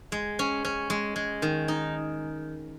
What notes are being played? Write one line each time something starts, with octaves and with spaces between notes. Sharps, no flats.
G#3
C#4
C#4
G#3
G#3
D#3
D#4